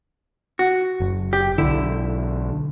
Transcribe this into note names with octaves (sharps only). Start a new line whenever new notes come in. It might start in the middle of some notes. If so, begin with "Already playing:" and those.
F#4
F#1
G4
B1 D3 E4